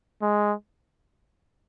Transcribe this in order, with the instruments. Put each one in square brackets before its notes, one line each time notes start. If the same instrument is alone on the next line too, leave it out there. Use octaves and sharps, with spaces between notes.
[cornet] G#3